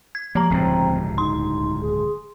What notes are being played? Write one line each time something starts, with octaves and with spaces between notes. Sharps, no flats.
G#6
F3 A#3 G4 A#5
D1 C#2 G2 C4
D#4 C6
G#4